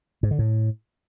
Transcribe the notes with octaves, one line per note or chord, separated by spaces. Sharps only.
G#2
D3
A2